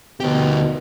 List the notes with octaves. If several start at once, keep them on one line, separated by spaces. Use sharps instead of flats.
D2 B2 G4